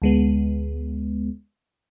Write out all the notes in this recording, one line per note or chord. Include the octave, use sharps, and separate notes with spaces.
D2 G#3 B3